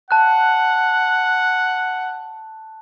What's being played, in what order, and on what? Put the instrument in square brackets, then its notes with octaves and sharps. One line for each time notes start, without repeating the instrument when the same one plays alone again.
[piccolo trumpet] F#5 [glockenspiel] A5 F#6